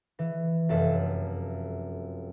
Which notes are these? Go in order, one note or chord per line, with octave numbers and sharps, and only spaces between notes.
E3
F1 F#2 A4 E5